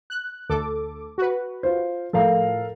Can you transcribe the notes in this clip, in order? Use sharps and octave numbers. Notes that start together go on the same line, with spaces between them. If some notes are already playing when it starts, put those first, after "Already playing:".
F#6
D2 A4 D6
F#4 B4
F4 C5
A2 F3 A4 A#4 F5